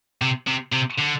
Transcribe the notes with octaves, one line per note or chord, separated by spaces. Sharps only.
C3
C3
C3
D3